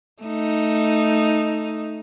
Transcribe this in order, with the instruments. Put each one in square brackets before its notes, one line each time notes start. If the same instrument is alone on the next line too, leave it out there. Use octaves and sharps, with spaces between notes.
[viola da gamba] A3 D#4